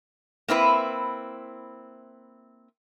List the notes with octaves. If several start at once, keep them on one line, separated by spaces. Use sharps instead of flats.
A#3 C4 E4 B4